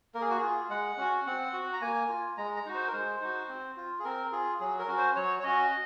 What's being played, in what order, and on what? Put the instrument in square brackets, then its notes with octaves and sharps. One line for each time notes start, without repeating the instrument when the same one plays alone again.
[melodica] A#3 A#4
G#4
F#4
G#4
F4
G#3 F#5
C#4 F#4
C4 F#5
F#4
A#5
A#3 G#5
F4
G#3 A#5
A#5
D#4 F#4
C5
A#4
G#3 C5
D#4 F#4
C4
F4
G#4
C4 A#4
F4 G#4
F#3 G#4
A#4
C#4 F#4
C5
F#3 C#5
C#5
C#4 F#4 D#5